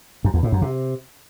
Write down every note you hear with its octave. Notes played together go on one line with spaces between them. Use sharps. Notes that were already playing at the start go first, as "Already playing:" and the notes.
F#2
E2
A2
F#2
C3